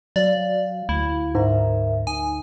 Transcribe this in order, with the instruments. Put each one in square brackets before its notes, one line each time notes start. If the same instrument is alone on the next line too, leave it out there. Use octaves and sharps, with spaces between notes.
[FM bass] F#3 [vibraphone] F#4 F5 [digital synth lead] D5
[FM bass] D2 [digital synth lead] E4
[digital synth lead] G#2 [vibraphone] A#4 E5
[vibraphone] D#4 [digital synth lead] G#5